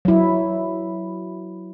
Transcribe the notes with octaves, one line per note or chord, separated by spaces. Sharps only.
F#3 E4